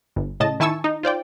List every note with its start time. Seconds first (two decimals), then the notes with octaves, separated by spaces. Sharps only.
0.16 G1
0.40 A2 C#3 D#5 A5
0.60 D#3 E4 G#5 A5 C#6 E6
0.84 D#4
1.03 F4 C5 D5 G5